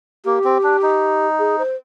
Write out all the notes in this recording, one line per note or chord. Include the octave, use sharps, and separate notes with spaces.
A#3 G4
C4
D4
D#4
G#4
C5